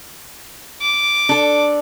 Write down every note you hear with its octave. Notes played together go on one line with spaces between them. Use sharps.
D6
D4 A4